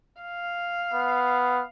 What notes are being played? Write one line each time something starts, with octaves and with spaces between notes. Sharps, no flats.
F5
B3